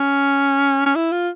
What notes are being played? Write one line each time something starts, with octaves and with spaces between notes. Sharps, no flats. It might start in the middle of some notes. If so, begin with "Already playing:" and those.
Already playing: C#4
C#4
E4
F4